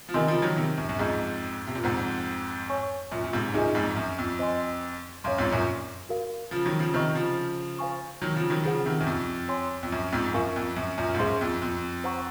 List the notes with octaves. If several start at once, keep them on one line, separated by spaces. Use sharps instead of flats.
F3
C3 D#3 A#4 D#5 G#5 C6
C#3 F3
D#3 F#3
C3 D#3
F#2
F#2
F2 G#2 G#4 D#5 A#5
C3
A#2
F2 G#2 C5 F#5 A#5
C#5 G#5 C#6
F#2 A#2
A#2
G#2 C3
F#2 A#2 D#4 G#4 D#5 G#5
F2 G#2
F#2
F2
C5 D#5 G#5 C6
F#2 C#5 F5 C6
F2 G#2
F#2 A#2
F#4 A#4 F5
C#3 F3
D#3 F#3
C#3 F3
C3 D#3 F4 C5 D#5 A#5 C#6
C#3 F3
C5 F5 G#5 C#6
D#3 F#3
C#3 F3
D#3 F#3
C#3 F3 F4 G#4 C5 F#5
C3 D#3
F#2
F2
C#5 G#5 C6
F2
F#2
F2 G#2
F#2 F4 A#4 F5 G#5 C#6
F2
F#2
F#2 A#2
G#2
F#2 G#4 C5 F5 C6
F2
F2
C5 F#5 A#5 C#6